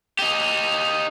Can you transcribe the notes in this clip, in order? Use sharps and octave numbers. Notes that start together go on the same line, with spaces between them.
D#4 G4